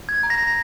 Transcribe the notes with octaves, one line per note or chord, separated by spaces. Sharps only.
G#6
A#5
A#6